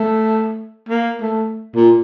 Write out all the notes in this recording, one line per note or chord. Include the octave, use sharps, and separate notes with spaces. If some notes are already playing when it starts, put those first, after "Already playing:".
Already playing: A3
A#3
A3
A#2